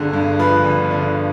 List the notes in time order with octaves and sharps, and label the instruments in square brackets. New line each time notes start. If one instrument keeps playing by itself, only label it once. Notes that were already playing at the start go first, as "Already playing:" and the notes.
Already playing: [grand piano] G1 D3 G#4
G2
F3 B4
G1
D3